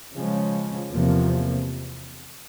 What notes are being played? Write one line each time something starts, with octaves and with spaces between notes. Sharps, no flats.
C#3 F3 G#3 C#4
E2 C3 F3 A#3